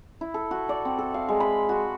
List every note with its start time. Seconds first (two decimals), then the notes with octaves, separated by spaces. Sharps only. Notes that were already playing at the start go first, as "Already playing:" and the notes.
0.21 E4
0.34 A4
0.51 F#4
0.69 D5
0.85 C4
0.99 A4
1.14 F5
1.29 G#3
1.40 B5
1.69 F#4